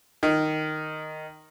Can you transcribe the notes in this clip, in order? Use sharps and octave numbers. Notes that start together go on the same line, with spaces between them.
D#3